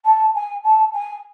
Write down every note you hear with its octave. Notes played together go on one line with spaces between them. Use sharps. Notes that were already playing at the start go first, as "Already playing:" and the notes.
A5
G#5
A5
G#5